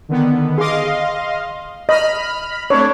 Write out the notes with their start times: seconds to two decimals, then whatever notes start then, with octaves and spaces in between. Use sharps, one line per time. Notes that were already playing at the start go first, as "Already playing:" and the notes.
0.09 D3 D#3 B3
0.58 G#4 D#5 F5 C6 D6
1.89 D#5 B5 F6
2.70 A3 C4 D4 C#5